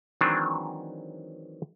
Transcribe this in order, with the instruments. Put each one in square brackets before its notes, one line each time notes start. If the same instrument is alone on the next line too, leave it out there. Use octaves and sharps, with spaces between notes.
[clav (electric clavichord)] D#3 E3 F#3 G#3 C4 D4